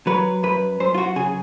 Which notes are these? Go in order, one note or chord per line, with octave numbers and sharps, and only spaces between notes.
F#3 B4
F#2 B4
F#2 C5
F4
F#4
C#3 G#4